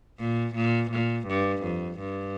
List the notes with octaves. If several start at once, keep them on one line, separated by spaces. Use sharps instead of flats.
A#2
A#2
A#2
G2
F2
G2